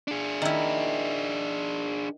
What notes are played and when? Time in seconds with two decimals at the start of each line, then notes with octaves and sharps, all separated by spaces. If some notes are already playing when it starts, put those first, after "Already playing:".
0.08 D4 G#4
0.42 D#3 E4